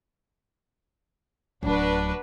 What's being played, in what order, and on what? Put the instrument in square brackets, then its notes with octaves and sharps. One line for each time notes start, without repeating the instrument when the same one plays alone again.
[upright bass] D1 F#3 [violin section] D4 F#4 B4